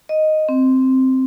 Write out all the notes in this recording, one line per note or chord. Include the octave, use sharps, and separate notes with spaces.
D#5
C4